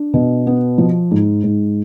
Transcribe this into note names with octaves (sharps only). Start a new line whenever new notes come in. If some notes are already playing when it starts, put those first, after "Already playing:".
Already playing: D4
B2
B3
F3
G#2
G#2